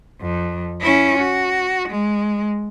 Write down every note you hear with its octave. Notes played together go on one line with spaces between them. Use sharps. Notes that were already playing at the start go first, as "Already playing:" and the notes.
F2
C#4 E4
F#4
G#3